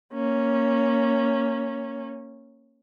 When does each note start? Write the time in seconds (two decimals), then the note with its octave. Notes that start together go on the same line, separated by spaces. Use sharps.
0.13 A#3 C#4